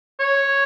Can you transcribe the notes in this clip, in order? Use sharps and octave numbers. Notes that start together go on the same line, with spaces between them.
C#5